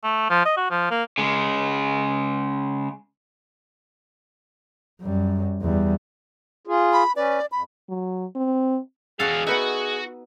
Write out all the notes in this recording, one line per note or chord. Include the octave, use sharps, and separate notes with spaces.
A3
F3
D#5
F#4
F3
A#3
C#3 G#3
F#2 G3
E2 G3
F4 G#4
B5
C#4 B4 D5
F2 B5
F#3
C4
E2 F#4 G#4 A4 F5
B3 D#4 F#4 B4 E5